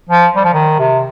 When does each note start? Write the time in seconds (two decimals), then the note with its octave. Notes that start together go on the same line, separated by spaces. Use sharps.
0.09 F3
0.36 G3
0.45 F3
0.54 D#3
0.79 C3